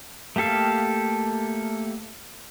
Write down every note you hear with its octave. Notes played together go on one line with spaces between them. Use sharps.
A3 A#3 G4 A4 F5